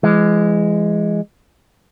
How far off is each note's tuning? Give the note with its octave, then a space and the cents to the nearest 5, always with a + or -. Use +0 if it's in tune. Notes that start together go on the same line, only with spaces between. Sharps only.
E3 +40 G#3 +0